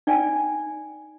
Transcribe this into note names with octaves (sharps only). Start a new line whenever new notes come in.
D#4 D5 G5 G#5